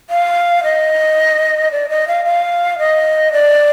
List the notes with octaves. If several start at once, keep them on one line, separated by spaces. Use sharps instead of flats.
F5
D#5
D5
D#5
F5
F5
D#5
D5